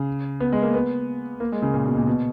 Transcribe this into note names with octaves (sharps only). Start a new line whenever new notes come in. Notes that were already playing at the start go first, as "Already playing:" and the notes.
Already playing: C#3
B3
G#3
A#3
B3
A#3
G#3
C#3
A#2
B2
A#2
B2